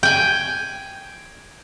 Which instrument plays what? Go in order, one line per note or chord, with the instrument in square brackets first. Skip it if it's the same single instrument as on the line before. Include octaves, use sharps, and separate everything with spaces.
[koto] G5 G#5